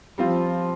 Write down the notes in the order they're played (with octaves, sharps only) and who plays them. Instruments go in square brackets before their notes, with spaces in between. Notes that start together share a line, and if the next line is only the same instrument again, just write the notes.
[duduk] F3 [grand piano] G3 C4 F4